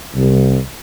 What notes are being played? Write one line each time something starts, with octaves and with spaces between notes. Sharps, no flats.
C2